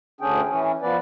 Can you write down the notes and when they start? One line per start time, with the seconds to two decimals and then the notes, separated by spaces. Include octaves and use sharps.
0.21 D2 D3 C#4 D4 G#4 G5
0.48 E3 C#4
0.82 F3 B3 B4 D5